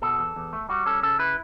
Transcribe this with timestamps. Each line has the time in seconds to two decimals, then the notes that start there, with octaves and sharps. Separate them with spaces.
0.02 B2 A4
0.19 E2
0.36 E2
0.53 A3
0.69 G3 F#4
0.86 C#4 A4
1.03 C#3 A4
1.19 E4 B4